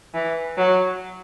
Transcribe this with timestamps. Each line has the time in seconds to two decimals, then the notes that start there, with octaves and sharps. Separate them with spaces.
0.14 E3
0.58 F#3